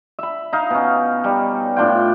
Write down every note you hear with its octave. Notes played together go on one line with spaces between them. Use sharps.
E5 B5
D#4 F5
B2 C#4
G3 D#4
A2 D4 F4 G5